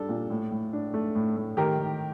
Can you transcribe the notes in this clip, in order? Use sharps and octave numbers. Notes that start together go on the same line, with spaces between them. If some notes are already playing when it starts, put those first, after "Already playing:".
Already playing: G3 D4 A4
A#2
A2
A2
D4
A3
A2
A2
D#3 G4 A#4
D#3